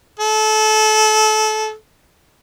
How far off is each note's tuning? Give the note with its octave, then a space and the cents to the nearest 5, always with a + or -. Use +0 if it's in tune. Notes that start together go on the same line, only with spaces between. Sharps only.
A4 -25